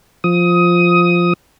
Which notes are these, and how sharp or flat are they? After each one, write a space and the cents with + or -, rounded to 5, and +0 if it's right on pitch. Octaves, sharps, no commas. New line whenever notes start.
F3 +0 D#6 +15